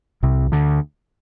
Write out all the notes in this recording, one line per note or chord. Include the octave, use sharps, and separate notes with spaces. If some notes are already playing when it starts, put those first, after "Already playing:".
C2 C3
D2 D3